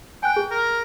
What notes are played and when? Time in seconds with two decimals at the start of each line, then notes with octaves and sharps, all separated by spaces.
0.23 G5 G#5 F#6
0.36 G#4
0.51 A#4